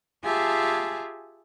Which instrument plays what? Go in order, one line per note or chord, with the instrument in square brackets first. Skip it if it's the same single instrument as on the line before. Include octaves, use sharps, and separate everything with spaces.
[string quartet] F4 G4 G#4 E5 G#5 A5